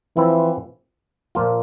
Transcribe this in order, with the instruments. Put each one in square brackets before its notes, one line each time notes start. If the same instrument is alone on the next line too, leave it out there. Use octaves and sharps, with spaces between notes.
[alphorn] E3 [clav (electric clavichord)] F3 C4 E4
[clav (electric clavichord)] A#2 F3 A#3 F4